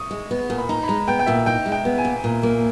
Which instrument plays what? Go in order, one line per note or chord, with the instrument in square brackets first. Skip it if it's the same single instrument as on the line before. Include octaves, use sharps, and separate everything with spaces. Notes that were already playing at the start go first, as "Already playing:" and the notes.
Already playing: [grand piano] C#6 D#6
[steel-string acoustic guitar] G#3
B3
A#2
[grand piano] B5
[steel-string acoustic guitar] D#4 [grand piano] A#5
[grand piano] B5
[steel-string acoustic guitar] G#3 [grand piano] A#5
[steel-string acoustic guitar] B3 [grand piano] G5
[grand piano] G5
[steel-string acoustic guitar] A#2 [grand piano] E5
[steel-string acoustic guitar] D#4 [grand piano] G5
[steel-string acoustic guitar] G#3
[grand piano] G5
[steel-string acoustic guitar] B3
[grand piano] G#5
[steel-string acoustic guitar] A#2
A#2
A#3